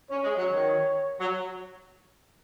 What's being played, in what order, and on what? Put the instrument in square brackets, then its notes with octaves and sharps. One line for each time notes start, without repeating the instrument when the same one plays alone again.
[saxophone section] C#4 [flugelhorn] C#5
[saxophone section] G#3
F#3
D#3
F#3